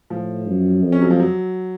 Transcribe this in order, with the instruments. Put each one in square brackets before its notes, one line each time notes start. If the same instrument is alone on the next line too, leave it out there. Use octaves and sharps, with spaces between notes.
[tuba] A2 [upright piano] F3
[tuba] F#2
F2
[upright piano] C#4
F#3
F3
F#3